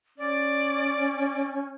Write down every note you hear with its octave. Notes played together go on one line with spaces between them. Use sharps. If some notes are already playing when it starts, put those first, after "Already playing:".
C#4 D5